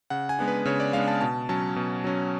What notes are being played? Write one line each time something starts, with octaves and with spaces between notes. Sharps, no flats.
C#3 F#5
G#5
G#3 B3 D4
B4
C#3 C#5
D5
G#3 B3 D4 F5
A5
B2 A5
F#3 C#4 A5
B2
F#3 C#4